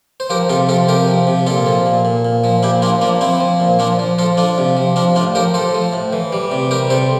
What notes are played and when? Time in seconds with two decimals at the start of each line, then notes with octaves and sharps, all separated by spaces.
0.20 C5
0.30 F3 G4 A#4
0.49 C3 F4 A4
0.69 F3 F4 A4
0.88 C3 G4 A#4
1.08 F3
1.27 C3
1.46 A#2 F4 A4
1.66 F3
1.86 A#2
2.05 A#2
2.25 A#2
2.44 F3
2.63 A#2 E4 G4
2.82 F3 D4 F4
3.01 F3 A#3 D4
3.21 F3 C4 E4
3.41 F3
3.60 A#2
3.79 F3 D4 F4
3.99 F3
4.18 F3 F4 A4
4.37 F3 D4 F4
4.58 C3
4.77 F3
4.96 F3 D4 F4
5.15 A2 D4 F4
5.35 F3 G4 A#4
5.54 F3 A4 C5
5.74 F3
5.93 A2
6.13 E3
6.32 G3
6.52 C3
6.71 G3 G4 A#4
6.90 C3 A4 C5